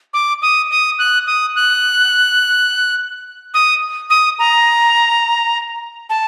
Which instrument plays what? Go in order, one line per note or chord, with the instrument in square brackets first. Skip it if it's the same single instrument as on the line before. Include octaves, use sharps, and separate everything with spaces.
[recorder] D6
D#6
D#6
F#6
D#6
F#6
D#6
D#6
A#5
A5